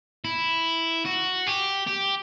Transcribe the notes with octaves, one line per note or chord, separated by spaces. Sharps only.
E4
F#4
G4
G4